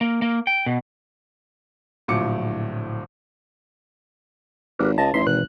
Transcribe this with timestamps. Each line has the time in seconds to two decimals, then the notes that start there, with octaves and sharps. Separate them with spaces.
0.01 A#3
0.22 A#3
0.47 G5
0.66 B2
2.08 D1 A#1 A2 F#3 D6 C#7
4.79 G#1 G4 A#4 B4
4.98 C#2 D#5 A5
5.14 A1 E3 D#4 E5 C6
5.27 G#1 B2 E3 F#6